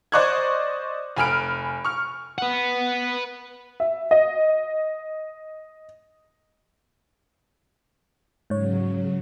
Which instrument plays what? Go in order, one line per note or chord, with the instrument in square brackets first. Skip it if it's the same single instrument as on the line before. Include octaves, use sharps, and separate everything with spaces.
[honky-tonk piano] C5 D5 D#5 C#6 F#6 G#6
F1 G#5 B5 F6 D7
C#6 F6
[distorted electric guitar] B4 F#5
[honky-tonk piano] E5
D#5
[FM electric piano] G#2 C#5 [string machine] C#3 F#3